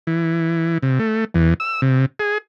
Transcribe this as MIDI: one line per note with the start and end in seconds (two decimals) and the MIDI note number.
0.07 0.78 52
0.83 0.99 48
0.99 1.25 57
1.34 1.54 40
1.60 1.81 88
1.82 2.06 48
2.19 2.38 68